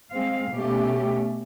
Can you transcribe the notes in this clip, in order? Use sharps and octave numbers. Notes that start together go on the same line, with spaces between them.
G#3 C4 F5
B2 A3 C#4 G4